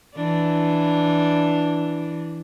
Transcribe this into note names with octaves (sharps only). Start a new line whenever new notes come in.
E3 D4